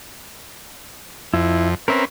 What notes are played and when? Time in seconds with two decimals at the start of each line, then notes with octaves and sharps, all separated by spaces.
1.34 F2 E4
1.88 C4 C#4 A#4 B4 E5 A#5